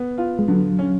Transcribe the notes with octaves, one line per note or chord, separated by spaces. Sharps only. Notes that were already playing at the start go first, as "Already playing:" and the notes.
Already playing: B3
F4
G#3
D3 F#3
C#4